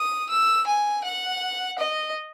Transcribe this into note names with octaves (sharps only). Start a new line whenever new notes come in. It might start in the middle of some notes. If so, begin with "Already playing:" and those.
Already playing: D#6
E6
G#5
F#5
D#5